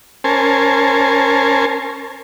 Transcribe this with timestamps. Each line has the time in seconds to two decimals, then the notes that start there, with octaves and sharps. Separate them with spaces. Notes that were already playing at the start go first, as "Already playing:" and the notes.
0.24 C#4 A#4 C5 G#5 A5